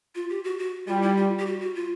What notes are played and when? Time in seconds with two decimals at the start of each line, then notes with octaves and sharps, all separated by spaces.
0.15 F4
0.30 G4
0.44 F#4
0.59 F#4
0.87 G3 F4
1.02 E4
1.17 F4
1.39 G4
1.46 F#4
1.61 F#4
1.75 F4